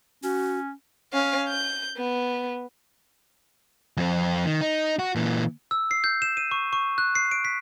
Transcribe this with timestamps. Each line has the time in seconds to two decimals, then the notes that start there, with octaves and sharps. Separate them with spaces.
0.23 C#4 F#4
1.13 C#4 F5
1.49 G6
1.97 B3
3.97 F2 C4
4.46 D#3
4.61 D#4
4.99 F#4
5.16 A#2 E3
5.71 E6
5.91 C7
6.04 G6
6.22 E7
6.37 D#7
6.51 C#6
6.73 C#6
6.98 F#6
7.15 C7
7.31 D7
7.45 B6